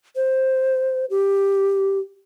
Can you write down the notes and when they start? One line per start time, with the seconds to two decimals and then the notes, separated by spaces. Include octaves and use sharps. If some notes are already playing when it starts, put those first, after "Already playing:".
0.16 C5
1.10 G4